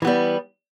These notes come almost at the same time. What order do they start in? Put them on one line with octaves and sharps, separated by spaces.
E3 B3 G3